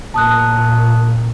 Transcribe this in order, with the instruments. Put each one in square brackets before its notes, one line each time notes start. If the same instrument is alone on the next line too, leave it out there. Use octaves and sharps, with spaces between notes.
[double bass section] A#2 [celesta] A5 D#6 F#6